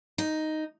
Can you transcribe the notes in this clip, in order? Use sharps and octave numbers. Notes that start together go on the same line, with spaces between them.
D#4